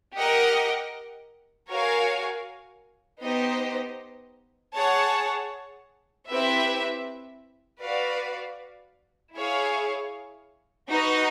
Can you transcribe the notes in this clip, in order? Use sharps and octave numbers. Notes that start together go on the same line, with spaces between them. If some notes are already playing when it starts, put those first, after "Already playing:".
G4 A#4 D#5 F#5
F#4 A#4 C#5 F5 G#5
B3 D#4 G4 C5 D#5
G#4 C#5 F#5 A5
C4 E4 G4 B4 E5
F#4 B4 D5 F5
E4 G#4 C#5 F5
D#4 F#4 B4 D#5